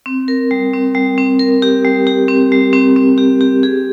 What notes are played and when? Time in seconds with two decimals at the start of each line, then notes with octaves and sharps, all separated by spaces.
0.06 C4
0.28 A#4
0.51 G3
0.73 C4
0.95 G3
1.18 C4
1.39 A#4
1.62 G4
1.85 G3
2.07 G4
2.28 C4
2.52 G3
2.73 C4
2.96 C4
3.18 G4
3.41 G4
3.63 G#4